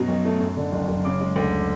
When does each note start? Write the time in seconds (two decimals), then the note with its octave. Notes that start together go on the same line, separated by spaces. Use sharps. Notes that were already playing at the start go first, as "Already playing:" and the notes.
Already playing: F#2 B2 F#3
0.08 B1
0.25 A3
0.41 F#2
0.57 D3
0.72 F#1
0.88 F#1
1.04 C#3 D6
1.21 G#3
1.36 D2